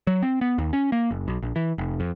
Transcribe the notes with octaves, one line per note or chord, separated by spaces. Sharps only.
F#3
C4
B3
D#2
C#4
A#3
F#1
B1
A#1
E3
F1
F2